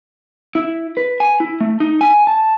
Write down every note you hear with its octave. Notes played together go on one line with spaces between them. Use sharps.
E4
B4
G#5
E4
A3
D#4
G#5
A5